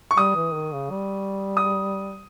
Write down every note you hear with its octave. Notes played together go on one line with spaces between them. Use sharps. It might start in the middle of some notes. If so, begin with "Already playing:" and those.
C#6
G3 D#6
E3
D#3
C#3
G3
D#6